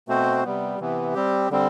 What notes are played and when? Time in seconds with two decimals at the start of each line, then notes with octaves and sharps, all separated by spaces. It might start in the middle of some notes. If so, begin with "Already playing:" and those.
0.08 B2 A3 C4 F#4 C5
0.44 C3 G3 B3
0.79 C3 E3 B3
1.14 G3 C4 G4
1.50 D3 G3 C4